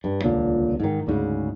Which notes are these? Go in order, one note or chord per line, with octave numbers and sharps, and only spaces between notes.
G2
D#1 C#2 A#2 D3
G#2 D#3
D2 G#2 C#3